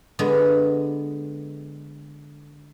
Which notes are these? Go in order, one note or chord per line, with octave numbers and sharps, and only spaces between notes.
D3 G#3 B3 G#4